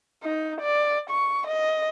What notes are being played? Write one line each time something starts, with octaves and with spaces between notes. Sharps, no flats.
D#4
D5
C#6
D#5